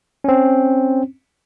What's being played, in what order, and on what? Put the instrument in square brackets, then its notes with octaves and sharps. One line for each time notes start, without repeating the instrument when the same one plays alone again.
[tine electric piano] C4 C#4